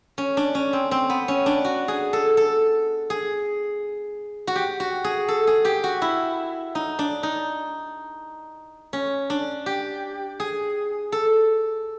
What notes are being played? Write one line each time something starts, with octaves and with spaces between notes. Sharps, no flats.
C#4
D4
C#4
C4
C4
B3
C#4
D4
F#4
G#4
A4
A4
G#4
F#4
G4
F#4
G#4
A4
G#4
G4
F#4
E4
D#4
D4
D#4
C#4
D4
G4
G#4
A4